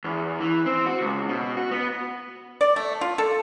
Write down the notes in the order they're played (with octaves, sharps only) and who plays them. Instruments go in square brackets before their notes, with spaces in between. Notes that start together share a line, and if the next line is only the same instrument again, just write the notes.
[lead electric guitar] E2
E3
C4
F#4
C#2
B2
F#4
B3
[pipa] D5
A3
F4
A4